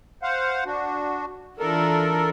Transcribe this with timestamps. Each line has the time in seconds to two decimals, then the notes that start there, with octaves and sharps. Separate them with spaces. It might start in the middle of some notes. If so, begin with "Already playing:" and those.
0.23 C5 F5 F#5
0.66 D4 F#4
1.59 E3 D4 F4 A4 A#4